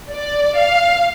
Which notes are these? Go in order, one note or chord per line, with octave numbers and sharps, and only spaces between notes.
D5
F5